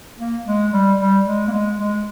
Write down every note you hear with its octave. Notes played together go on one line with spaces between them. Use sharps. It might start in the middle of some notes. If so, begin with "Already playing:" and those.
A#3
G#3
G3
G3
G#3
A#3
G#3
G#3